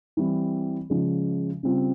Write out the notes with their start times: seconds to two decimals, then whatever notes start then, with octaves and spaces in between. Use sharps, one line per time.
0.17 E3 G3 C4 E4
0.90 C#3 F3 G#3 C#4
1.63 C#3 G3 C4 F4